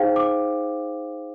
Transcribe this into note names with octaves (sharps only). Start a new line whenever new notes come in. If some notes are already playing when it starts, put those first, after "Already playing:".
Already playing: D#4 G#4 C5 F5 G5
D6